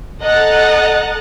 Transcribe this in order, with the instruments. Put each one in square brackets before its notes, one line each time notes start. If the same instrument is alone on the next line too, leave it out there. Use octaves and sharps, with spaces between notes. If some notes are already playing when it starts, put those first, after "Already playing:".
[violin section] A4 D#5 F#5 A#5 F#6 A6